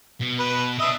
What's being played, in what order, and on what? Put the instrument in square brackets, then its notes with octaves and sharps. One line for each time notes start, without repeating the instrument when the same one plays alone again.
[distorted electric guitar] B2
[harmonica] B4
[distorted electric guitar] D4 D#5 [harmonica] E5 D#6